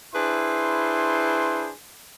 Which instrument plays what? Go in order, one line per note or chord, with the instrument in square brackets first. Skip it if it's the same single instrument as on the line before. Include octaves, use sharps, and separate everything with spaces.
[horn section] D4 E4 G#4 B4 C5 C6